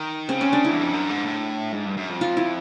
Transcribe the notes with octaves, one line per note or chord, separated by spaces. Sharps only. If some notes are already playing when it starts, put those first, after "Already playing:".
Already playing: D#3
C#3 C4
C#4
D4
E4
E2
F2
F#2
G#2
A2
G#2
G2
F#2
F2
F4
E4